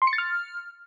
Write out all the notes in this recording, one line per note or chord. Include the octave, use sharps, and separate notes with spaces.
C6
C#7
A6
F6